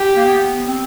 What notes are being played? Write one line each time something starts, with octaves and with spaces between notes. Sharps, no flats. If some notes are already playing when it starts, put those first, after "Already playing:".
Already playing: G4
A#3
B3
C4